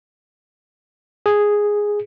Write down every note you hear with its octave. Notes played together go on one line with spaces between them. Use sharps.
G#4